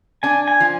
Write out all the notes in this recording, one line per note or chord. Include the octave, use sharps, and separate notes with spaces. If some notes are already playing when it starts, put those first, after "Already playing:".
D4 G#5
G#5
F3